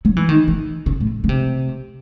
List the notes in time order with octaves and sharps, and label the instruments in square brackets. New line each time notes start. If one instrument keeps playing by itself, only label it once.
[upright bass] F#3
E3
D#3
E3
C#3
A2
C#3
C3